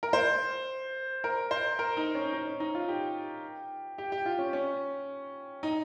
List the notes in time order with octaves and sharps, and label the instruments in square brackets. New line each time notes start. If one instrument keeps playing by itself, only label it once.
[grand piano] A#4
C5
A#4
C5
A#4
D#4
C#4
D#4
C#4
D#4
F4
G4
G4
G4
F4
C#4
C#4
D#4